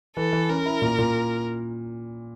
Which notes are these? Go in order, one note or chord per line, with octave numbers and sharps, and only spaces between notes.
E3 A4
E3
C#4 A#4
E4
A#2
A#2